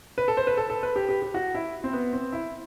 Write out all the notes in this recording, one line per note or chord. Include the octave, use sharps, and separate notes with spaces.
B4
A4
C5
B4
A4
A4
B4
G4
G4
G4
F#4
E4
C4
B3
C4
E4